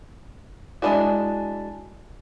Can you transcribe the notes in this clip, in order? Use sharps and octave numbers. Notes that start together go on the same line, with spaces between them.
G#3 B3 D4 E4 F#4